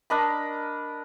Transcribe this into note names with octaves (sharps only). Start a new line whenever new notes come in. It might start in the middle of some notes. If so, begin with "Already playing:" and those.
D4 A#4 D#5 B5